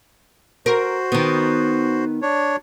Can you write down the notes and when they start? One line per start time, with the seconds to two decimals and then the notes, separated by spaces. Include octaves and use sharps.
0.66 F#4 A#4 C5
1.12 D#3 B3
2.22 D4 C#5